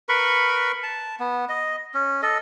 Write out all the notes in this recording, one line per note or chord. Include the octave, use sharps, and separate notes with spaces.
A#4 B4 B5 C#6
A5
B3
D#5
C#4
A4 D#5